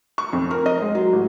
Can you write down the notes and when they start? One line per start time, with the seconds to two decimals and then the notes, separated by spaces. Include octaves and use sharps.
0.18 C#6
0.33 F2
0.51 A#4
0.66 D#5
0.82 G#3
0.95 F#3
1.13 A1